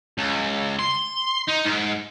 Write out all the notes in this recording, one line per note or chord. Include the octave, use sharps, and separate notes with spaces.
C#2
C6
D#4
G#2